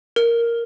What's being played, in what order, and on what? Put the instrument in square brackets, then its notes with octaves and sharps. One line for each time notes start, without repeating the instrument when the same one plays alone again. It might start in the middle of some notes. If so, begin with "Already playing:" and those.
[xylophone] A#4